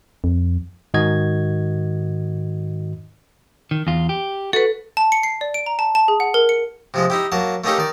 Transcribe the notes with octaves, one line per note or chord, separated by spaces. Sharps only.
F2
G#2 D#3 F#4 D#5 G#6
D#3
E2 F4
G4
F#4 A4 B4
A5
C#7
C7
D5
D7
A#5
A5
A5
G#4
F#5
A#4
C#7
C3 F3 G#3
D#4 E4 G4
F#3 A#3 A5
A3 A#3 C#4 D#4 G4 A4
D#3 D5